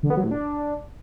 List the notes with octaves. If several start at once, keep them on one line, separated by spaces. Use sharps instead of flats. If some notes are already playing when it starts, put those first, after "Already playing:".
D3
B3
F#3
A2
D4